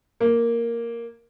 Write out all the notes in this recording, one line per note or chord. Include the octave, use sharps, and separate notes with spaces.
A#3